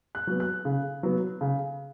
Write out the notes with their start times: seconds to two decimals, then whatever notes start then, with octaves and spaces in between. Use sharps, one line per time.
0.15 F#6
0.27 F#3 B3
0.40 F#6
0.65 C#3
1.03 F#3 B3
1.41 C#3